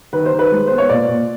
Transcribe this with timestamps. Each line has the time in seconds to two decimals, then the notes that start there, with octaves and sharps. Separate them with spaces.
0.13 D#3 B4
0.26 C5
0.33 D#3
0.39 B4
0.52 G#3
0.67 B3 C5
0.78 C#5
0.89 A#2 D5
1.08 A#2